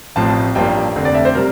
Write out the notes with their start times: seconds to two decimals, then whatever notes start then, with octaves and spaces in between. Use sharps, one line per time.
0.16 A1 A2 F3 C4 A5
0.55 A1 G2 F3 A#3 G5
0.95 F1 F2 D3 A3
1.05 D5
1.14 E5
1.25 C5
1.35 C3 G3 A#4